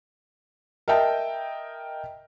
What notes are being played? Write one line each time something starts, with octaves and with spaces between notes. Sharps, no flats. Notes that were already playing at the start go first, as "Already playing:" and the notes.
A#4 D#5 E5 G5 A5